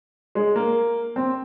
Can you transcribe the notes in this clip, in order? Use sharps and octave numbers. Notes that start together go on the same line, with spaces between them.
G#3
A#3
C4